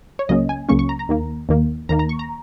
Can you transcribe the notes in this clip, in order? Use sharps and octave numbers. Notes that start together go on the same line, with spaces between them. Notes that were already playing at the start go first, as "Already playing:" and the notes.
C#5
C#2 C#3 F#3 A#3 C#4 D#5
G#5
C#2 C#3 F#3 A#3 C#4 C#6
C#6
A#5
A#5
D#2 D#3 A#3
D#2 D#3 A#3
D#2 D#3 A#3 A#5
A#5
C#6
A#5